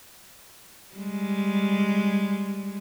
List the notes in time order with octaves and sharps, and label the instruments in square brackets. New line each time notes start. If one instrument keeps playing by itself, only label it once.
[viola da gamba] G3 G#3